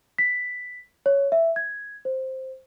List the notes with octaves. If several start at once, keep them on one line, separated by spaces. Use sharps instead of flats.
B6
C#5
E5
G#6
C5